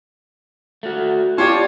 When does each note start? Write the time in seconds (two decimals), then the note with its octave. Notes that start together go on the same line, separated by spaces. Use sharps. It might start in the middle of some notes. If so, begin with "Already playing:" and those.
0.83 A3 F#4
1.38 F4 G4 C#5 D5 A5